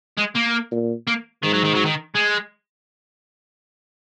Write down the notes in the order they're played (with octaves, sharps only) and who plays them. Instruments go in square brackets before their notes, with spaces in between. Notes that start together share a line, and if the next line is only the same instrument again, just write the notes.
[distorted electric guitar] G#3
A#3
[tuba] A#2
[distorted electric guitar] A#3
[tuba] G#2 [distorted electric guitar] D#3
[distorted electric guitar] F#3
D#3
F#3
D#3
G#3